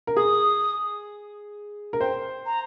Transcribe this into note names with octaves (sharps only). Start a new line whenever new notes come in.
A#4
G#4 D#6
A#4
C5 G5
A#5